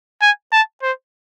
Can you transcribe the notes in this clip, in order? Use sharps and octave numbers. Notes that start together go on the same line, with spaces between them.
G#5
A5
C5